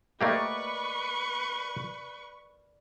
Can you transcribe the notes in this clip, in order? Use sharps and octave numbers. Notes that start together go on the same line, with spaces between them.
A3 A#3 G4 A#4 B4 D5 D#5 C#6